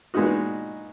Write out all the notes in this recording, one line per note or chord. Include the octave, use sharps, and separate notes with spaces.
A#2 G#3 B3 D#4 F#4